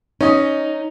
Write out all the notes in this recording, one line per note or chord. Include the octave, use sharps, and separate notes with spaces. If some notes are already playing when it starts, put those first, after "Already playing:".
C#4 D#4 D#5